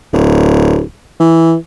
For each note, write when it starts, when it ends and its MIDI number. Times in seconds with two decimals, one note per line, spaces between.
0.13 0.83 26
1.20 1.55 52